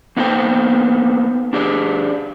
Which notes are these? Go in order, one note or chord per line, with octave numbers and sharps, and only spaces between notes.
A#3 B3 D#4 A4 C5 G5
D4 G4 G#4 D5